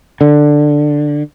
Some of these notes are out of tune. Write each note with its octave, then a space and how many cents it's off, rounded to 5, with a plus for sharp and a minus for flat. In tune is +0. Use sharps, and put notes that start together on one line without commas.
D3 +10